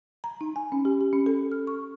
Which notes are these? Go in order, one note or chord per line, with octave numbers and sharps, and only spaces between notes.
A#5
D#4
G#5
C#4
G4
G4
C#4
A4
F6
C#6